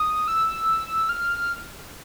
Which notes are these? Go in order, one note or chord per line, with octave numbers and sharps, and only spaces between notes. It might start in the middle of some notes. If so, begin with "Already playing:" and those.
Already playing: D#6
E6
F6